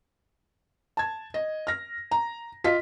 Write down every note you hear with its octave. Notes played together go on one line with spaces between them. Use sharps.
A5 G#6
D#5
F6 A#6
A#5
F4 D#5 B6